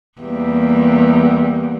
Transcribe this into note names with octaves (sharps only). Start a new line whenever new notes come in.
E2 G3 A#3